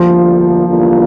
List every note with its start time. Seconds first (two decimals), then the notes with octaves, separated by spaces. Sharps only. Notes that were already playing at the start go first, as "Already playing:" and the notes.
Already playing: D2 D3 F3 G3 A#3 F4
0.67 E2 D3 G3 A#3 F4